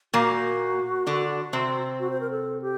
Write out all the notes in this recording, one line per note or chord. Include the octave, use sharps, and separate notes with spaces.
A#2 A#3 F#4
D3 D4
C3 C4
F#4
C5
A#4
A4
G4